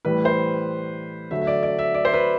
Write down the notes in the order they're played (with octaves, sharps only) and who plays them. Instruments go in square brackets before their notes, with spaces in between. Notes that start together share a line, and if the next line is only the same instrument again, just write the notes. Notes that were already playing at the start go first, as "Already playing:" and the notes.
[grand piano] A2 E3 G3 B4
C5
D3 F#3 A3 E5
E5
D5
D5
E5
D5
C5
B4